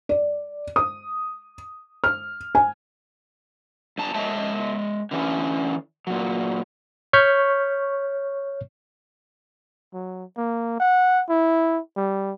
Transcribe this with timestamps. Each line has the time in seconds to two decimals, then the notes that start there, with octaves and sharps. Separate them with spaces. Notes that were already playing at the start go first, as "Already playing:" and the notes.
0.09 D5
0.76 D#6
2.04 F6
2.55 G#5
3.98 G2 A5 A#5
4.14 G#3 C#5 D#5 E5 A5
5.11 D3 E3 C#4
6.07 A#2 F#3
7.13 C#5 C#6 F6 G6 B6
9.94 F#3
10.37 A#3
10.80 F#5
11.29 E4
11.96 G3